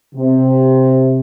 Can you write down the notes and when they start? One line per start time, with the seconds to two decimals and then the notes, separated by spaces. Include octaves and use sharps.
0.14 C3